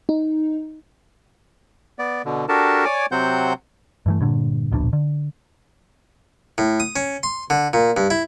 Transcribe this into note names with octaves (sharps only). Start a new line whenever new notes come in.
D#4
B3 D5
B2 D3
D4 F#4 G4 A4 A#4 A5
C#5 D5 G#5 D6
C3 F#3 C4 C5 F#5 G6
G2 E3 A3
G2 A#2 D3
D1 A#1 B2 D4
D3
A2
D#6
C#4
C6
D3
A#2
G2
E4